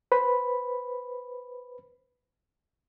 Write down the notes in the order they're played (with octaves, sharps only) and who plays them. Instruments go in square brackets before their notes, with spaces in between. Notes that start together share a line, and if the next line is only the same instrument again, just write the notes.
[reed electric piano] B4 C5 B5